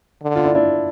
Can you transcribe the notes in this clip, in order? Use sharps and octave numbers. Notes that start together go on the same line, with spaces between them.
D3
F4
D4 E4
D4 E4